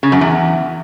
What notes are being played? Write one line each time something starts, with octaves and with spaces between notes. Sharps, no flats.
C#3
F#2
E2